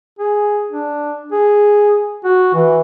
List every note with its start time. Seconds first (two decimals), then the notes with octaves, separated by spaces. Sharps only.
0.19 G#4
0.71 D4
1.32 G#4
2.24 F#4
2.54 E3